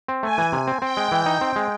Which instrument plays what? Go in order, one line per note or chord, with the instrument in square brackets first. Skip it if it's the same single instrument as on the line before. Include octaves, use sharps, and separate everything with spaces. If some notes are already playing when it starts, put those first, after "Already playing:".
[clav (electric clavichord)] C4
[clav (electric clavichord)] A3 [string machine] G#5
[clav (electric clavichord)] E3
C3
C4
[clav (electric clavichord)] C4 [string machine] G5
[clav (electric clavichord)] G#3
E3
D#4
C4
G#3